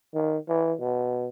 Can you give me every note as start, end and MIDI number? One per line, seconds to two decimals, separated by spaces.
0.14 0.38 51
0.48 0.74 52
0.80 1.29 47